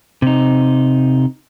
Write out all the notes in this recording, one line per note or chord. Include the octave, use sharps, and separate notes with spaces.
C3 D#4